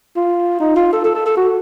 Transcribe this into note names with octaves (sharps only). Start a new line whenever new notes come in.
F4
D#4
F4
A4
A4
A4
A4
F#4